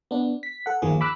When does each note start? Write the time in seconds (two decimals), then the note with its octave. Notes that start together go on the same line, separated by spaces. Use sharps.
0.11 B3 D4
0.43 B6
0.66 A4 F#5
0.82 G1 D#2 D#3 F3 A#3 G#4
1.01 B5 D6 E6 F#6